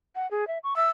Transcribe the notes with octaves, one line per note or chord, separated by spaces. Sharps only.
F#5
G#4
E5
C#6
E5 E6